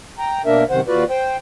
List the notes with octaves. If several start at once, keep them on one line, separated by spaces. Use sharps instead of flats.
G5 A#5
B2 A#3 D4 A#4 E5
F#2 C3 D#3 C5 F#5
D#2 F4 F#4 B4 D5
C5 G5